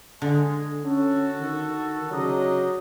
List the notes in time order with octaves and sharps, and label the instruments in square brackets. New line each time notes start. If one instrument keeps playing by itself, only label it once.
[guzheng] D3 [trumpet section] G#3
[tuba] C#4 [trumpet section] F#4 A4
[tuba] D#3
[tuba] C#3 [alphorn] F#3 [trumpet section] D4 D#4 D#5